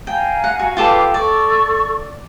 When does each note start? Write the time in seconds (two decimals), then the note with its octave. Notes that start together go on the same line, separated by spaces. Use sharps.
0.07 F5 G5 G#5 A#5
0.44 F#5
0.59 F#4
0.77 F4 G4 A4 B4 F5 D6
1.14 A4 D5 C#6